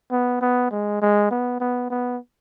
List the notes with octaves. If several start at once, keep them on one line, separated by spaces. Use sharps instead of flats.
B3
B3
G#3
G#3
B3
B3
B3